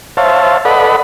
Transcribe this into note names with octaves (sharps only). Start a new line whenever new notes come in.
C5 C#5 E5 F5 A5
A4 B4 D5 D#5 F#5 B5